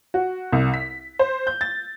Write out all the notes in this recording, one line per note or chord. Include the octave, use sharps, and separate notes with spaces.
F#4
C2
B6
C5
G6
A6